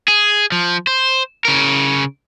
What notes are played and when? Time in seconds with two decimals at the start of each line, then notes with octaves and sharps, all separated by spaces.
0.08 G#4
0.52 F3
0.87 C5
1.45 C#3 A#4